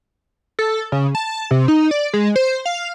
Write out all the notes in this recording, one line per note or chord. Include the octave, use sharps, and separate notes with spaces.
A4
C#3
A5
C3
D#4
D5
G#3
C5
F5